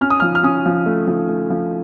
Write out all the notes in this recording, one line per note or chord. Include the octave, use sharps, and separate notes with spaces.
C#4 F6
D#6
F3 F6
F6
C#4 D#6
F3
A3
F3
A3
F3